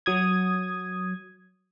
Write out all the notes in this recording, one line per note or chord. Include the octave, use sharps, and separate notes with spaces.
F#3 D#6 G#6